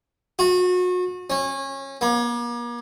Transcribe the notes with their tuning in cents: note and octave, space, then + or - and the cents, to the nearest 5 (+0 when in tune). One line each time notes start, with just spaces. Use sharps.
F#4 -35
C#4 -25
A#3 +40